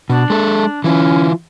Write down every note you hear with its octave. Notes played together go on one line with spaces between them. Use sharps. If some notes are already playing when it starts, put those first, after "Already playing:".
B2 D4
G#3 A4
E3 C#4 F4